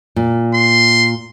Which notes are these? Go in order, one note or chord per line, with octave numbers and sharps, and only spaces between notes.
A#2
C6